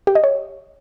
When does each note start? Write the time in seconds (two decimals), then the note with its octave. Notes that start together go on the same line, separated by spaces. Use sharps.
0.07 G4
0.15 D#5
0.24 C#5